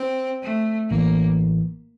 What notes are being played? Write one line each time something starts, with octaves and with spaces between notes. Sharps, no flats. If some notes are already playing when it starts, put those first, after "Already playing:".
Already playing: C4
A3
A1 A2 E3 A#3